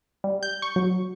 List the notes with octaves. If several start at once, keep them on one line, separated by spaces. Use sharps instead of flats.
G3
G6
C#6
F#3